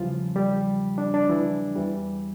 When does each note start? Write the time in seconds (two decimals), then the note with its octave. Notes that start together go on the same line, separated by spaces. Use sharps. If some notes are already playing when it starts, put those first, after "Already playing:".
Already playing: E2 C#3 E3 F3 G3 F4
0.36 G3 G4
0.98 D4
1.14 D4
1.29 E3 E4
1.76 E2 E3 G3